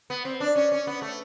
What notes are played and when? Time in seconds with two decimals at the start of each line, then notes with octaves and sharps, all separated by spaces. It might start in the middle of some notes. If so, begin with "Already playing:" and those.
0.10 B3
0.25 C4
0.40 D4
0.56 C#4
0.72 C#4
0.87 B3
1.02 A3